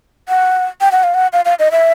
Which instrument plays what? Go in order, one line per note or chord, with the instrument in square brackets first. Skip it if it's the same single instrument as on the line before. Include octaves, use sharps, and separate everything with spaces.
[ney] F#5
G5
F#5
F5
F#5
F5
F5
D#5
E5